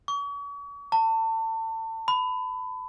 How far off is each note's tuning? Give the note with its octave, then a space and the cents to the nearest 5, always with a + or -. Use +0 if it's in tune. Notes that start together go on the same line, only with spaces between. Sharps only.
C#6 +40
A5 +30
B5 +20